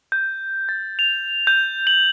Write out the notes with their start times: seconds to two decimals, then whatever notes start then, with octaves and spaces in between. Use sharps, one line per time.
0.12 G6
0.69 A6
0.99 F7
1.47 G6
1.87 F#7